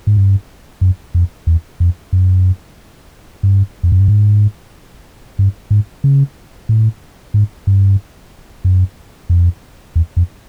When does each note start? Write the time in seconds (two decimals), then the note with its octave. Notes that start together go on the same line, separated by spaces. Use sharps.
0.07 G#2
0.17 G2
0.81 F#2
1.14 F2
1.47 E2
1.80 F2
2.13 F#2
3.43 G2
3.83 F2
3.92 F#2
4.00 G2
4.08 G#2
5.39 G2
5.71 G#2
6.04 C#3
6.69 A2
7.34 G#2
7.67 G2
8.65 F#2
9.30 F2
9.96 E2
10.17 F2